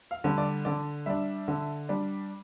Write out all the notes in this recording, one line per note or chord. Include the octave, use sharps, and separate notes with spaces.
F5
D3 G3
D5
D3 D5
G3 D4 E5
D3
G3 D4